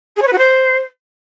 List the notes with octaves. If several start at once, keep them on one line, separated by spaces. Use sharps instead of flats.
G#4
C#5
B4
F#4
C5